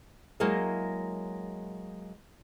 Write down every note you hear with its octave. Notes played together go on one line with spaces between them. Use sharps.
F#3 G#3 A#3 E4 D#5 F5